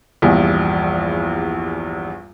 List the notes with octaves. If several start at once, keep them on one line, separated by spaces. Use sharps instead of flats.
A#1 E2 G2